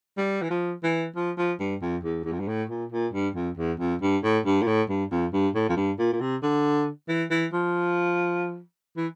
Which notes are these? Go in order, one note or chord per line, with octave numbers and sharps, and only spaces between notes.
G3
E3
F3
E3
F3
F3
G2
F2
E2
E2
F2
G2
A2
A#2
A#2
G2
F2
E2
F2
G2
A2
G2
A#2
A2
G2
F2
G2
A2
F2
G2
A#2
A#2
C3
D3
E3
E3
F3
E3